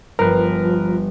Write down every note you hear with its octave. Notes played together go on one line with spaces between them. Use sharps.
G1 F3 A#4 B4